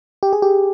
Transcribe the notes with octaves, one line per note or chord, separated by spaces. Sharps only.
G4
G#4
G4